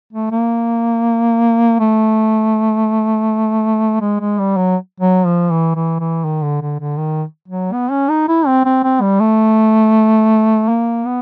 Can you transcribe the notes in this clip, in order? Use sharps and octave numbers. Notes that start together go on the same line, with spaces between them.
A3
A#3
A3
G#3
G#3
G3
F#3
F#3
F3
E3
E3
E3
D#3
D3
D3
D3
D#3
F#3
B3
C#4
D#4
E4
C4
C4
C4
G3
A3
A#3
B3